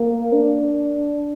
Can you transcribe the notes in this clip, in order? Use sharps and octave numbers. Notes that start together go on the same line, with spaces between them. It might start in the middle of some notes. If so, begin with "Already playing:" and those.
Already playing: A#3
D4